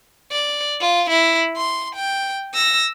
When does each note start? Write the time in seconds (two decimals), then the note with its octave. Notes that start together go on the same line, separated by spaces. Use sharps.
0.32 D5
0.81 F4
1.10 E4
1.57 C6
1.95 G5
2.54 E6 A#6